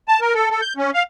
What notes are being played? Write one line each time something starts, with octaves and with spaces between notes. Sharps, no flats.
A5
A#4
A4
A4
G6
C#4
F5